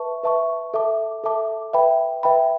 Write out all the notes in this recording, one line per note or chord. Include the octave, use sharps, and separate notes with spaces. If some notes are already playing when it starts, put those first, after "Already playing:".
Already playing: B4 E5 A5 C#6
B4 E5 A5 C#6
A4 E5 A5 D6
A4 E5 A5 D6
B4 E5 G5 B5
B4 E5 G5 B5